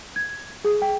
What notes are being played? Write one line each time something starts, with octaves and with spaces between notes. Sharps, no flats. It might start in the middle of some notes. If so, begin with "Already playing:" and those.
G#6
G#4
G5